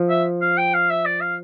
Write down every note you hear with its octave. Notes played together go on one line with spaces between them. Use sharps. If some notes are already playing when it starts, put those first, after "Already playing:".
Already playing: F3
E5
F5
G5
F5
E5
D5
F5